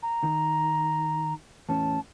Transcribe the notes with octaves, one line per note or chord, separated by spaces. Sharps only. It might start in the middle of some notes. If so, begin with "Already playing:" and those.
A#5
D#3
E2 A2 C#4 A5